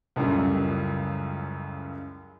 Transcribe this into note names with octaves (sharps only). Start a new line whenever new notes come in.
C#2 F#2 A2 C#3 G3